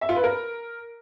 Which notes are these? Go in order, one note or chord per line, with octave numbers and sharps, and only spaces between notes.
E5
F4
B4
A#4